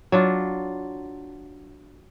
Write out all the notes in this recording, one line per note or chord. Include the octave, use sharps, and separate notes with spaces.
F#3 D4 F4